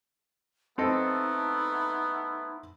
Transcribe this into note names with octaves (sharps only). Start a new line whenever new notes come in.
A3 B3 C4 D#4 E4 A4 D#5